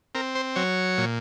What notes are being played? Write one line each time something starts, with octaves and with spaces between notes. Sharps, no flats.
C4 A#4
C5
F#3 C#5
A#2